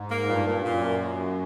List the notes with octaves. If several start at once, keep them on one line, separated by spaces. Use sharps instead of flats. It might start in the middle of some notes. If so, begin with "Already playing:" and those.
Already playing: G#2
A#3
G2 A#2
A#2
F#2 A#2
A#3